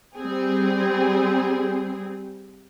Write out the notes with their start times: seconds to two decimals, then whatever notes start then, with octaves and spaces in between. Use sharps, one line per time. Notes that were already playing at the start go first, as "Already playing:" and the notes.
0.15 G3 C4 G#4